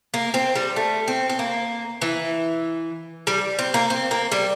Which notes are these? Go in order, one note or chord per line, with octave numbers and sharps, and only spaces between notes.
A#3
C4
G3
A3
C4
C4
A#3
E3
G3
C4
A#3
C4
A#3
G3